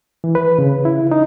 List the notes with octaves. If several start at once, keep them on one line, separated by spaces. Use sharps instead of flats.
E3
B4
C#3
E4
D#4